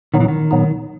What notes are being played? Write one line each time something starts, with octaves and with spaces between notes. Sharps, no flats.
A#2 D#3 F#3 B3 D#4
E3
D#3
A#2 F#3 B3 D#4